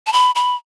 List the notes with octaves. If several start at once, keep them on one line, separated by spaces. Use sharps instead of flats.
A5
B5
B5